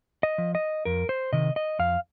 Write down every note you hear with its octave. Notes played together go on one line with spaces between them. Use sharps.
D#5
F3
D#5
F2 A#4
C5
C3 D#3 D#5
D#5
F2 F5